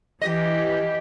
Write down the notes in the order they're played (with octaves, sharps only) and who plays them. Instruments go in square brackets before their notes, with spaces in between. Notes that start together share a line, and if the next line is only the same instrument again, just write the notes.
[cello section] E3 G4 [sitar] D#5